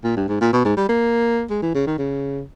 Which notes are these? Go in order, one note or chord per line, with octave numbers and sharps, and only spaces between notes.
A#2
G2
G#2
A#2
B2
G#2
G3
A#3
G#3
E3
C#3
D#3
C#3